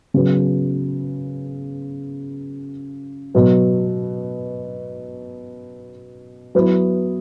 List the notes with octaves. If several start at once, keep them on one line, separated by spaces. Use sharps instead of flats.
C#3 F#3 B3
B2 F#3 B3
F#3 B3 E4 B4